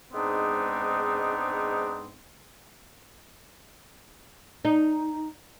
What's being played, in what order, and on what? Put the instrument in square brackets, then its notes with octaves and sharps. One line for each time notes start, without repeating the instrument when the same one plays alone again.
[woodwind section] G#2 G#3 B3 C4 D4 D#4
[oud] D#4